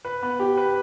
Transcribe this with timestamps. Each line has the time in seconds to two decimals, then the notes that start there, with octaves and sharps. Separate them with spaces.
0.05 B4
0.23 B3
0.39 G4
0.57 B4